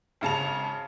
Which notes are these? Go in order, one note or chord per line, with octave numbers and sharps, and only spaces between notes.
G#1 C#3 A5 F7